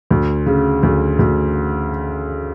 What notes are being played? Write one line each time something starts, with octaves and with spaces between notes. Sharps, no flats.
D2
C#3
D2
D2